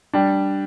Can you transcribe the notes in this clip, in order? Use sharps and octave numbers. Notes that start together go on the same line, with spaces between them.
G3 D4